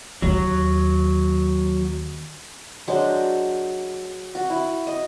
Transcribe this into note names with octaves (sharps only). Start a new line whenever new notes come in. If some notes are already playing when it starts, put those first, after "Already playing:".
D#2 F#3
F#3 G#3 D4 C5
F#4
E4
D#5